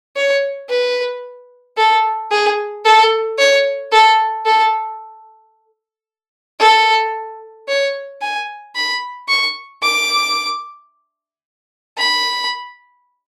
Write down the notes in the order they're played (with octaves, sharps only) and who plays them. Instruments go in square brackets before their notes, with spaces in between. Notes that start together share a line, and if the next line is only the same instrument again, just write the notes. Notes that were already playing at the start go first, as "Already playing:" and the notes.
[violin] C#5
B4
A4
G#4
A4
C#5
A4
A4
A4
C#5
G#5
B5
C#6
D6
B5